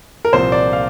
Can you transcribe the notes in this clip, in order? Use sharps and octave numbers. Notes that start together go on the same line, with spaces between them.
A#4
C2 A#2 F3 A#3 C5
D5
F5